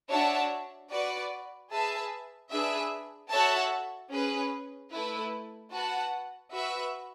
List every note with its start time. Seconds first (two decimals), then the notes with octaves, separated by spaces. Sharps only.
0.10 D4 F#4 C#5 E5 A5
0.90 F#4 B4 D5
1.71 G#4 B4 E5 A5
2.51 D4 G#4 B4 E5
3.31 F#4 A4 C#5 E5 A5
4.11 C#4 G#4 B4
4.91 A3 E4 B4
5.72 F#4 B4 F#5 A5
6.52 F#4 B4 E5